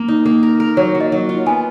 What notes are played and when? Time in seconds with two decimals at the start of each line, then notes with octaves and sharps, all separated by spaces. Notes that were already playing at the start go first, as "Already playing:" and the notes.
Already playing: A#3 A#4
0.08 D#4
0.26 A#3
0.43 A#4
0.60 A#4
0.77 F#3 C#5
0.95 F#3
1.01 D#5
1.12 F#3
1.29 F4
1.46 B3 G#5